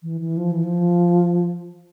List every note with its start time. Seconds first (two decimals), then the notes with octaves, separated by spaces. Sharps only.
0.03 E3
0.21 E3
0.37 F3
0.51 E3
0.64 F3